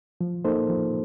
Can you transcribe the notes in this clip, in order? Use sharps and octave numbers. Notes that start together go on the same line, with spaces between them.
F3
A#3 D#4 A4 C5
F3